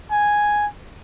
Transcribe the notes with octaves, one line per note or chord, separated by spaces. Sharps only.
G#5